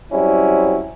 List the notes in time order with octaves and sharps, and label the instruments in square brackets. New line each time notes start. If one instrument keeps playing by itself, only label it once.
[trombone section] F#3 G3 C4 C#4 E4